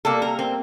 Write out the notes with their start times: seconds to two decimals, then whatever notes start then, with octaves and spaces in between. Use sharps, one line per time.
0.05 C3 G3 A#3 A4
0.22 A#4
0.39 C4